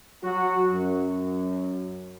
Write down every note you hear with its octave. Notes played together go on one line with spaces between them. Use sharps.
F#3 F#4
F#2